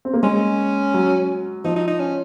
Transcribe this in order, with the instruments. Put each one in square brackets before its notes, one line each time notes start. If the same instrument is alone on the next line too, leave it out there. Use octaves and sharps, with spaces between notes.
[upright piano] C4
A#3
[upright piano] G#3 [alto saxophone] C#4
[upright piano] F#3
[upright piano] F3 [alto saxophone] D#4
[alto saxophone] D#4
D#4
C#4